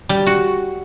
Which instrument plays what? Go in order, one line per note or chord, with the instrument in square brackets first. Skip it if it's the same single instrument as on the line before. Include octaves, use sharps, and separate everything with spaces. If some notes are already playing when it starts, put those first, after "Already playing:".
[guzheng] G3
F#4